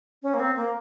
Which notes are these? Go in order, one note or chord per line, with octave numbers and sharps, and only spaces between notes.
C#4
A#3
C4
A#3